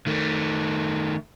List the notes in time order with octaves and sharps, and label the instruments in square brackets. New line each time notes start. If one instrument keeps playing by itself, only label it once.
[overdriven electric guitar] D#3 A3